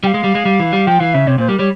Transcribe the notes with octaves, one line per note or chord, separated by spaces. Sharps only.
G3 F5 G5
G#3
G3
G#3
G3
E3
G3
F3 G5
E3 F5
C#3 E5
C3 C#5
A#2 C5
G3 A#4
G3 C#5